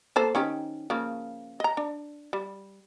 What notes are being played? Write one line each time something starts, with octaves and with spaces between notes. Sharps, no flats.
A#3 A4 C5
D#3 C#4 G4
C#3 F3 A#3
D#5 A#5
D4
G3